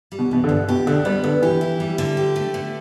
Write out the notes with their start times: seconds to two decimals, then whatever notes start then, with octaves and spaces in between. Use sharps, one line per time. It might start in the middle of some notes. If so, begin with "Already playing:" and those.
0.12 G3
0.19 B2
0.31 B2 E3
0.44 D3
0.49 G2
0.68 B2 G4
0.87 D3 D4
1.05 G3 B3
1.24 B2 D3
1.42 E3 G4
1.61 E4
1.80 G3
1.98 D3
2.17 G4
2.36 A3
2.54 D3